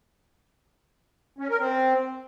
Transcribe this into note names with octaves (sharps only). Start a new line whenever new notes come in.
C#4
A#4
C4